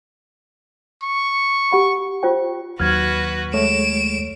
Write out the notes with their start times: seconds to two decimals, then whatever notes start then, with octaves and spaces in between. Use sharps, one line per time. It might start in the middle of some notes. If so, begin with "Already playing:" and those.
1.03 C#6
1.71 G4 F#5 B5
2.23 F4 C5 G5
2.80 D#2 F#3 F#4 B4 F6 G#6
3.54 G#3 A3 C#5 D7 E7